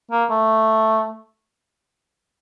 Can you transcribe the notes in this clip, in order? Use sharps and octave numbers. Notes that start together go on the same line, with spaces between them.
A#3
A3